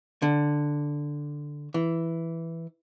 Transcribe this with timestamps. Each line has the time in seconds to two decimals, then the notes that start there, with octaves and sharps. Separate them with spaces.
0.22 D3
1.74 E3